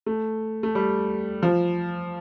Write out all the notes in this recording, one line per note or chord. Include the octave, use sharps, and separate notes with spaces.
A3
A3
G3
F3